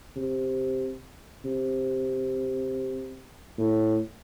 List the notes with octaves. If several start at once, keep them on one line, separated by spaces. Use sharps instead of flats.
C3
C3
A2